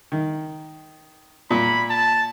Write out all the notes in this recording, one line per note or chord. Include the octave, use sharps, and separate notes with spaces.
D#3
A#2 B5
A5